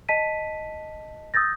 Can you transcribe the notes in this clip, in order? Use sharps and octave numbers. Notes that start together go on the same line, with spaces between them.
D#5 A5 B6 D#7
D#6 E6 G6 A6 A#6